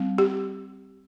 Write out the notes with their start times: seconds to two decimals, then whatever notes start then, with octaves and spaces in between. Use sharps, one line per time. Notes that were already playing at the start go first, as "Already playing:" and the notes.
Already playing: G3 C4
0.18 G4